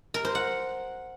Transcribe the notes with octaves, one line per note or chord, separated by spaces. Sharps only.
A#4
C5
F#5